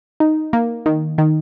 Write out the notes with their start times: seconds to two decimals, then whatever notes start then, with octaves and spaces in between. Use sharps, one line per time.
0.20 D#4
0.53 A#3
0.86 D#3
1.18 D#3